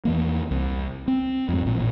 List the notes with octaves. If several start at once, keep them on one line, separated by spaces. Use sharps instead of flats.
E2 E3 A#3
C2
C4
F2 G#2
A1 A#2